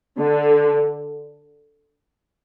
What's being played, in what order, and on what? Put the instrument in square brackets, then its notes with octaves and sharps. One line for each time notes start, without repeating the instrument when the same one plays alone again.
[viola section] D3